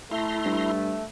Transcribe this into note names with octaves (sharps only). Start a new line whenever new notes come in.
A3 E4 A#5 C6
G2